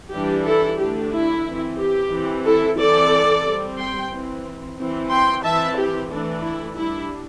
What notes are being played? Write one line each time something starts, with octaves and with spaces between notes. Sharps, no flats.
E3 G3 D4 G4
E4 A4
D3 A3 D4 G4
E4
E3 C4
G4
E3 C4
E4 A4
E3 C4 A4 D5
G3 C4
G5 C6
E3 C4
E3 C4
G5 C6
E3 C4 E5 A5
G4
E3 A3 D4
E4
G3 D4 E4